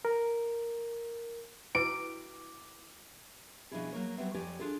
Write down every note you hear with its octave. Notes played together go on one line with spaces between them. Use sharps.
A#4
E4 B4 D6 D7
B2 F3 C#4 D4 E4 G#4
F#3 A#3 C#5
F#3 G3 B3 C4 E5
F2 F3 G4 C#5 D5 G#5
D4 F4 G#4 A4 D5